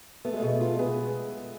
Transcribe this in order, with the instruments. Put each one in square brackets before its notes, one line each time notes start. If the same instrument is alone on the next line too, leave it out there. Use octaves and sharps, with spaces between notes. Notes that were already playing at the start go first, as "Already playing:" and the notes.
[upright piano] A3 [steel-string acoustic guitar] B3
[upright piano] G#3
[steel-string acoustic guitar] B2 [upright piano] A3
[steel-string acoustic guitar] F4
[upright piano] B3 [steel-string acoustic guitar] G#4